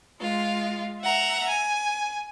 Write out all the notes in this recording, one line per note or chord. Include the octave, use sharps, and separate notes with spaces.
G#3 F4
E5 F#5 A#5
G#5